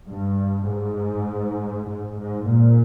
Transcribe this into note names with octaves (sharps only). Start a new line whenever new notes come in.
G2
G#2
G#2
G#2
A#2